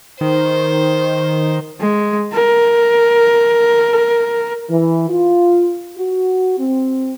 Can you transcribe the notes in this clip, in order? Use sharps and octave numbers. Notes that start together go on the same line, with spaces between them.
D#3 C5
G#3
A#4
E3
F4
F#4
C4